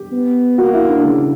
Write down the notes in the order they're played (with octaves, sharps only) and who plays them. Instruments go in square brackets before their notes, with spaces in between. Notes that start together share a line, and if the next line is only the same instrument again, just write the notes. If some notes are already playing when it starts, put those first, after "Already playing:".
Already playing: [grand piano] G4
[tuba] B3
[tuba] A#3 [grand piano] F#4
[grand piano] E4
D4
[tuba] C#3